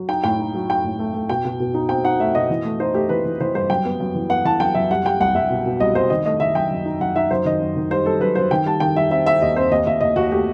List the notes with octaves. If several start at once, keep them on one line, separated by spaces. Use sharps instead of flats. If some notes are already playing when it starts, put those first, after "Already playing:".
Already playing: F#3
D#4 G5
A2 G5
D#4
F#3
D#4 G5
A2
A3
A3
B2 G5
B2
B2
D#4
C4 G5
D#4 F#5
A3 E5
B2 D#5
E3
A3
D#4 C5
A3 G4
E3 B4
E3
E3 C5
G2 C5
F#2 G5
B3
F#2
E3
B3 F#5
E3 A5
F#2 G5
F#2 E5
G3 F#5
G3 G5
C2 F#5
C2 E5
B2
B2
C2 D#5
C2 C5
D#3 D#5
A3 D#5
D#3 E5
F#2 G5
F#2
D#4
F#2 F#5
D#4 E5
F#2 C5
D#3 D#5
F#2
D#3
G3 C5
G3 A4
F#2 B4
F#2 C5
D#3 G5
G3 A5
D#3 G5
G3 E5
C4 E5
C4 E5
D#2 D#5
C4 C5
D#2 D#5
D#2 E5
D#2 D#5
D#2 F#4
A3 G4